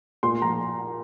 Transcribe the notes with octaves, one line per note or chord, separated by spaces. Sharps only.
A#2 C6
F3 A#5